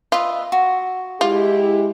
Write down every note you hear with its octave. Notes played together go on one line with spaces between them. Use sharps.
F4 B4 D#5 E5
F#4
G#3 E4 F4 G4